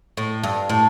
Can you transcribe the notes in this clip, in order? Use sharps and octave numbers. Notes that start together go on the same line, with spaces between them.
A2
G2
A2